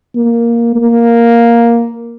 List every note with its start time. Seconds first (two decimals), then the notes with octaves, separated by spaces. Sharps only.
0.15 A#3
0.75 A#3